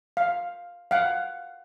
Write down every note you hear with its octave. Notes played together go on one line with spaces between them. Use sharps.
F5
F5 F#5